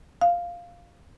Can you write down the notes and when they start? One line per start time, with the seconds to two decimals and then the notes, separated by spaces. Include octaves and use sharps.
0.21 F5